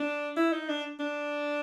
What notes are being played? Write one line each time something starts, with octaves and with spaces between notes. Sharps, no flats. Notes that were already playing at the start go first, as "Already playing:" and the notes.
Already playing: D4
E4
D#4
D4
D4